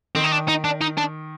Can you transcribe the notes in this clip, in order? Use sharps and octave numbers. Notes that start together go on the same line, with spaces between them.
D#3 C4
D#4
D4
D#4
D4
D#4
D4